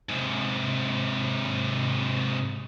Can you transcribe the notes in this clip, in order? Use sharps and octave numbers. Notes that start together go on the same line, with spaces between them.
G#2 C3